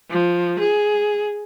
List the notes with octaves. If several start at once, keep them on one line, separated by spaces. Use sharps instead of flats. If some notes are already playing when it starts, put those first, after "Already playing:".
F3
G#4